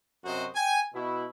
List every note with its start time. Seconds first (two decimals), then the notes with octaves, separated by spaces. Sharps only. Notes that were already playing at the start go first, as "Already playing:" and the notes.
0.24 F#2 C3 F#4 C5 D#5
0.55 G5 G#5
0.94 B2 E4